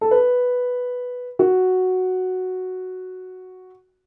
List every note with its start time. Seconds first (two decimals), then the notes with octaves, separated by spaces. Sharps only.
0.01 A4
0.11 B4
1.39 F#4